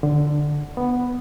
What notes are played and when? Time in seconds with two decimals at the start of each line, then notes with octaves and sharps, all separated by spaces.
0.03 D3
0.77 B3